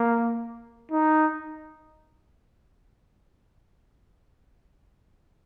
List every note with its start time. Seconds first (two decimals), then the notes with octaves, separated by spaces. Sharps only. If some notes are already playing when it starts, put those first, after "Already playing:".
Already playing: A#3
0.91 D#4